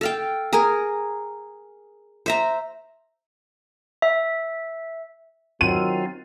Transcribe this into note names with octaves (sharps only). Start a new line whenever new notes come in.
A4 F5 G5
G#4 A#4 G#5 A#5
C5 E5 A#5
E5
D#3 F#3 C4 F4 D#7